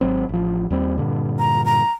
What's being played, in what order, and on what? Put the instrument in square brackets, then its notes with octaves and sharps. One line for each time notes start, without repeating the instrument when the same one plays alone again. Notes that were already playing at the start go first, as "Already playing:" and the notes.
[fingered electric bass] G#1 F#3 C4
A1 F3
D#2 G3 C4
G2 A#2 D3
[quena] A#5
A#5